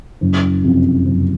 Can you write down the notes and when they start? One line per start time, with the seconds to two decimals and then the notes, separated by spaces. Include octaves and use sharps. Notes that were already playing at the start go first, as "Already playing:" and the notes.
0.21 F#1
0.63 F2 C3
1.06 F#1